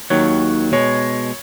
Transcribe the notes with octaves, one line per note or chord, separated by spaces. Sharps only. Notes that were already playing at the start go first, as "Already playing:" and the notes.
D#2 D#3 F#3 C#5
B2 G#3 C#5